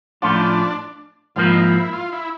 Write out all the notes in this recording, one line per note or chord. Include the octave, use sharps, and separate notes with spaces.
A2 F3 A3 C#4 D4 F4
G#2 F3 A#3 F4
E4
D#4
E4
F4
E4